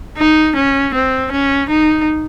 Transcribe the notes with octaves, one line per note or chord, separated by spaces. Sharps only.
D#4
C#4
C4
C#4
D#4